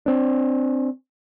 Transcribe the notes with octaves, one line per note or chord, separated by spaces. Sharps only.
C4 D4